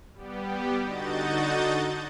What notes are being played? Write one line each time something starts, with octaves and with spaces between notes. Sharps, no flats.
G3 B3 G4
D3 D#4 F#4 D#5 G6 A6